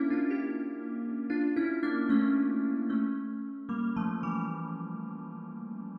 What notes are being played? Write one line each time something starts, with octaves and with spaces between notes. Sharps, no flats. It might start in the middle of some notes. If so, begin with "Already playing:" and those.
Already playing: A#3 C#4 D4 E4
D4 F4
E4 G4
D4 F4
C#4 E4
A#3 D4
A3 C#4
A3 C#4
G3 A#3
F3 A3
E3 G3